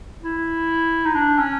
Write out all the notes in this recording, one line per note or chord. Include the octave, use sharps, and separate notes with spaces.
E4
D#4
D4
C#4